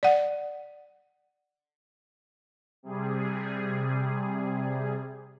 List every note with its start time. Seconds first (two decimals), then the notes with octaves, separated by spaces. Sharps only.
0.03 D5 F#5
2.83 C3 G3 G#4